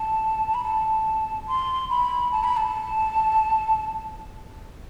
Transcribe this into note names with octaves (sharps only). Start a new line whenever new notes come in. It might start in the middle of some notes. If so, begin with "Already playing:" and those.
Already playing: A5
B5
A5
C6
B5
A5
B5
A5